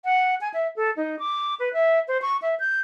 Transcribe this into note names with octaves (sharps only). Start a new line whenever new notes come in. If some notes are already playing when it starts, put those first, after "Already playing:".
F#5
G#5
E5
A4
D#4
D6
B4
E5
C5
C#6
E5
G6